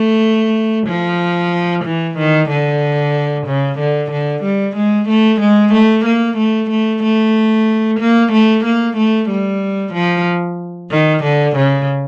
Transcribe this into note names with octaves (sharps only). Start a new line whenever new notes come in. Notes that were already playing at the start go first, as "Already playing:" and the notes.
Already playing: A3
F3
E3
D#3
D3
C#3
D3
D3
G3
G#3
A3
G#3
A3
A#3
A3
A3
A3
A#3
A3
A#3
A3
G3
F3
D#3
D3
C#3